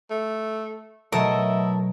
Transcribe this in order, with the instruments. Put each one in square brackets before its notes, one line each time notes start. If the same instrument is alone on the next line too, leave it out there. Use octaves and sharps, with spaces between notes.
[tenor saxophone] A3
[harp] B2 F#3 A3 [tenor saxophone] E4 [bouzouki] A4 A#4 E5 [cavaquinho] D#5